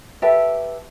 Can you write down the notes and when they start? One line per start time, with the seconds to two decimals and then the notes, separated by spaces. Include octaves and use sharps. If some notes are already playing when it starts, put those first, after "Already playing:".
0.22 G4 A4 B4 E5